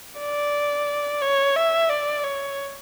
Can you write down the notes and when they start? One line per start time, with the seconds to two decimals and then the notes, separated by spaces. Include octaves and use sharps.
0.20 D5
1.22 C#5
1.56 E5
1.90 D5
2.24 C#5